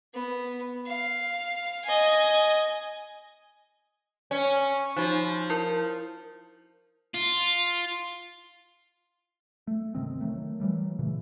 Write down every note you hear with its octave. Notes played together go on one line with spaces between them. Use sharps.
B3
F5
D#5 G#5
C#4
F3 D#4 F#4
E4 A#4
F4
A3
G1 C3 D#3 C4
D#3 F#3 A3
E3 F#3 G3 A3
A#2 C#3 E3 A3